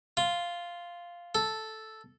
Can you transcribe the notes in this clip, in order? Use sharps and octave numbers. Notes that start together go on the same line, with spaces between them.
F4
A4